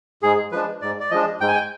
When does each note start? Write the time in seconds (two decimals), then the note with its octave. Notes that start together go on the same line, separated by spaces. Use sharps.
0.23 G#2 G#4
0.52 F3 G#3 D4 B4
0.82 G#2 D5
1.00 D5
1.11 F3 G#3 D4 D#5
1.41 G#2 G5
1.48 G#5
1.54 G5